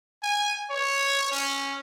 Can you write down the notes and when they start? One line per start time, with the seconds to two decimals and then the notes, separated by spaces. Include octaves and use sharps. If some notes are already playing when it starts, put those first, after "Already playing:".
0.23 G#5
0.71 C#5
1.32 C#4